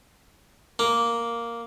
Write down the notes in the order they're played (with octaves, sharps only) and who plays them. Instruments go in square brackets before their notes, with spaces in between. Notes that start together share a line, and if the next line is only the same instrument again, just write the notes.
[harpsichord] A#3